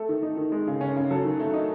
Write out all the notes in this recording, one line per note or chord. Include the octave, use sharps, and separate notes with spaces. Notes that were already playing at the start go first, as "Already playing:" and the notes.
Already playing: A3 A4
D#3
D#4
D#3
G#3
C#3
C#4
C#3
F#3 A4
D#3
A3
D#4